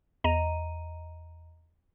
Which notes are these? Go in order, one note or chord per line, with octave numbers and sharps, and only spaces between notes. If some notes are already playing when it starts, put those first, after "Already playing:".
E2 D#5 A#5 D#7